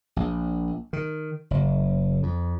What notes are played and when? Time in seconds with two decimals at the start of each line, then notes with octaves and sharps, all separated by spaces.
0.16 A#1
0.93 D#3
1.51 F#1
2.23 F2